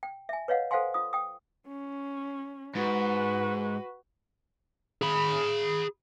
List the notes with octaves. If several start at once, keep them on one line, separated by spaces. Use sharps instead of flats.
G5
E5 G#5
B4 C#5 D#5 F5 F#5
A4 C5 F5 F#5 G#5 C6
F4 D#6
G5 D#6
C#4
G#2 F#4 B4
G#4 B5